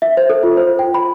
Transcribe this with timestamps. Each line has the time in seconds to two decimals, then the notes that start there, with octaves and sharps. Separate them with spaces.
0.02 E5
0.17 C5
0.30 A4
0.43 F4
0.57 C5
0.79 G5
0.94 B5